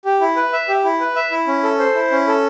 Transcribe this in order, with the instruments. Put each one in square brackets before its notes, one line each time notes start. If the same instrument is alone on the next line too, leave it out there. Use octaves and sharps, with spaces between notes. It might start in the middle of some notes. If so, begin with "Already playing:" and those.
[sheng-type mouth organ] G4
E4
B4
E5
G4
E4
B4
E5
E4
C#4
A4
C5
E4
C#4
A4